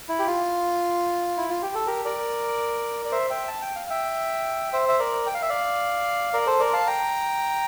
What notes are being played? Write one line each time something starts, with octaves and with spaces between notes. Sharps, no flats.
E4
G4
F4
E4
F4
G4
A4
G4 A#4
A#4 D5
D5
C5 E5
E5 G5
A5
G5
F5
E5 G5
C5 E5
E5
A#4 D5
G5
F5
E5
D5 F5
A#4 D5
A4 C5
A#4 D5
F5 A5
G5 A#5